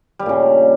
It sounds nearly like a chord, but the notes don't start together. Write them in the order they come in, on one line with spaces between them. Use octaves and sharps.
G3 G2 A#2 C#3